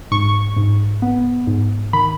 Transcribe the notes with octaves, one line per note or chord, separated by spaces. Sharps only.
G#2 C#6
G#2
B3
G#2
D#3 B5